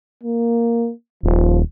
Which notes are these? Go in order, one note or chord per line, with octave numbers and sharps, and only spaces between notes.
A#3
D#1 F3